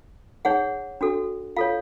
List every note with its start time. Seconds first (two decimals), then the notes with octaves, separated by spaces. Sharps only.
0.45 D#4 G#4 C#5 F#5
1.01 D4 F#4 A4
1.56 F4 A4 C#5 F5